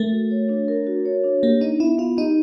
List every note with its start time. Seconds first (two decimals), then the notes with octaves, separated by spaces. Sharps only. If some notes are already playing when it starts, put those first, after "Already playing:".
Already playing: A3 A#4
0.12 F#4
0.31 C#5
0.49 D4
0.68 A#4
0.87 F#4
1.05 C#5
1.24 D4
1.43 A#3 G4
1.61 D4 D#4
1.80 B3 E4
1.98 B3 F4
2.17 D#4 G4